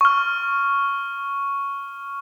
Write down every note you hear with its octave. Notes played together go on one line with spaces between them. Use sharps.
C#6 F6